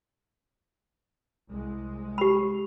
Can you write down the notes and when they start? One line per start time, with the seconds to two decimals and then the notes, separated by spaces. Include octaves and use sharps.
1.49 C2 G#3
2.18 G4 B5